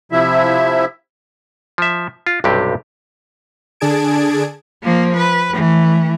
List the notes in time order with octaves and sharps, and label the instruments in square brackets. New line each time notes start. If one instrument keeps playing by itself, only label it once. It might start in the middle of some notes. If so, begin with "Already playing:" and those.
[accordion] C3 F3 E4 E5
[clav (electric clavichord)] F3 E5
F4
B1 G2 C3 C4 G4
[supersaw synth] D3 D4 G#4 A5 G#6 D7
[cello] F3 A#3
B4
E3 A3